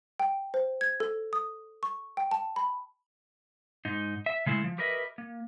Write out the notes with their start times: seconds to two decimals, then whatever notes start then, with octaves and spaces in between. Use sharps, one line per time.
0.20 G5
0.54 C5
0.81 G#6
1.00 A4
1.33 D#6
1.83 C#6
2.17 G5
2.31 A5
2.56 B5
3.85 G#2 D#4
4.26 E5
4.46 C#3 G#3 A3 E4
4.64 F3
4.78 G4 A#4 B4 D#5 E5
5.18 A#3